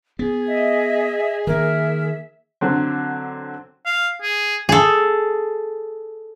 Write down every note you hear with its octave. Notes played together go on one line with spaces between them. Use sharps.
B3 G#4
D#5 E5
D#3 A#3 A#4 E5
D3 F#3 C4
F5
G#4
G#4 A4